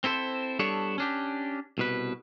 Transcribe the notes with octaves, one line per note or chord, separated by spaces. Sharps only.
C4 E4 A4 C5
G3 B3 D4 E4 A4 C#5
C#4 D4 G4
C2 B2 B4